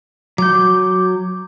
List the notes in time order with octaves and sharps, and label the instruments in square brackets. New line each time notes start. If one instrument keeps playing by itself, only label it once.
[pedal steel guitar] F#3 G6 [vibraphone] D6